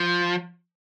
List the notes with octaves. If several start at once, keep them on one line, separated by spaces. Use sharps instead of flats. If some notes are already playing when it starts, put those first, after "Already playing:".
Already playing: F3